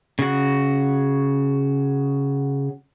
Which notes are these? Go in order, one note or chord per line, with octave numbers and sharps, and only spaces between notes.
C#3 F#4